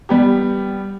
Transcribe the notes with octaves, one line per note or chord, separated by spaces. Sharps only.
G3 B3 G4